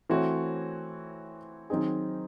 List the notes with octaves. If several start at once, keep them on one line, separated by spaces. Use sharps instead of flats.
E3 A3 C4 F#4 C#5
D#3 F#3 C4 D#4 G#4